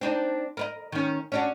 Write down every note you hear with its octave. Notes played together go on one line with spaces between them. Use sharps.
C4 D4 D#4
A#4 B4 D#5
D#3 C#4
C#4 D4 F#4